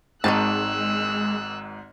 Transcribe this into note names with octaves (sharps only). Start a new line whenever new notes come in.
G#1 G#2 D#3 E3 G#3 A5 E6 F#6